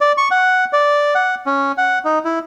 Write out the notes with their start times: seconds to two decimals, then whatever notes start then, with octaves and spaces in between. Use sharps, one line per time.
0.01 D5
0.18 C#6
0.31 F#5
0.73 D5
1.15 F#5
1.46 C#4
1.78 F#5
2.05 D#4
2.25 E4